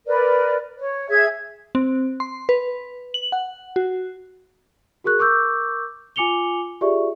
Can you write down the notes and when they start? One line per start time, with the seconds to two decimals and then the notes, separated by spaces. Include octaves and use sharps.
0.07 A#4 B4 D5
0.78 C#5
1.09 G#4 E5 G#6
1.75 C4
2.20 C6
2.49 B4
3.14 F#7
3.32 F#5
3.76 F#4
5.04 F#4 G#4 A#4 C#6 F#6
5.19 A#4 C#6 D6 E6 G6
6.16 F4 G#5 D6 C#7 F7 G7
6.81 F4 G4 G#4 D5 E5 C#6